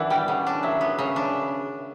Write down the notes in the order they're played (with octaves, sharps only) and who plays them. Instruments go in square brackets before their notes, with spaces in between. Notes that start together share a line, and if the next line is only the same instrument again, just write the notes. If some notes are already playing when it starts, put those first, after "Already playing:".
Already playing: [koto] E3 D4 [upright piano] D5 E5 F#5
[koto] G3 [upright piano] G5
[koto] C#3 [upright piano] F#5
[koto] D4
[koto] F#3 [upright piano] E5
[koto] B3
C#3
D4